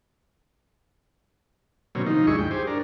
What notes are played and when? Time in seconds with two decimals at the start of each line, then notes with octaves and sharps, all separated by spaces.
1.95 B2 D3 F#3 A#3 C4 C#4
2.06 D#3 F3 D#4
2.27 D2 G2 G#3 E4 G#4 C#6
2.39 G5
2.51 G4 G#4 C5
2.67 D4 A#4